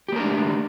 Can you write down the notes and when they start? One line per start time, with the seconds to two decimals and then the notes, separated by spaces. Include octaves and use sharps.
0.08 G4
0.12 A#3
0.16 A#4
0.20 D4
0.24 A3